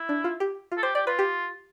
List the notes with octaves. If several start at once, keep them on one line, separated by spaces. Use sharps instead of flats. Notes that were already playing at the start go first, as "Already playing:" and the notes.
Already playing: E4
D4
F4
G4
F4
A4
G4 C5
G4 D5
F4 B4
G4